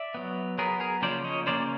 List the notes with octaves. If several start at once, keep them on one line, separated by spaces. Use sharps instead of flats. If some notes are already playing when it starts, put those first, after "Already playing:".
Already playing: D5 E5
F#3 B3
F#3 B3 G#4 A#4
G#4 A#4
C#3 F3 A#3 C#4 C5 D5
C#5 D#5
C#3 F3 A#3 C#4 C5 D5